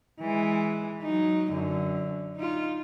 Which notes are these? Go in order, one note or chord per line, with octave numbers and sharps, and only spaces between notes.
E3 G#3
F#3 D#4
F#2 D3
D#4 F4